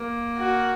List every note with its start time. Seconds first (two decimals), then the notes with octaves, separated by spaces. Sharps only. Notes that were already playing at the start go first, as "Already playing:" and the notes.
Already playing: A#3
0.37 F#4